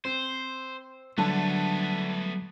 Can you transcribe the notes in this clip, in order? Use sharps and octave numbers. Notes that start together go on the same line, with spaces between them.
C4 C5
D3 F#3 G3 A3 B3 D4 A5